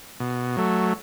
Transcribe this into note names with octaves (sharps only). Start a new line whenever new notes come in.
B2
F#3 A3